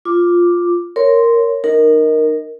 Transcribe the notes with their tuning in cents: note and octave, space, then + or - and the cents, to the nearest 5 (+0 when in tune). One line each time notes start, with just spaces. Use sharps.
F4 +0 D6 +0
A#4 -5 C#5 +0 C6 -5
D#4 -35 A#4 +0 D#5 +20